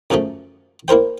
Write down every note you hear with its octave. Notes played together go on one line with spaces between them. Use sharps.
F#2 C#3 F3 F#3 A3
A#3 E4 A#4 C5 G5